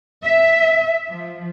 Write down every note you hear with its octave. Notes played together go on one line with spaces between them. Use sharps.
E5
F3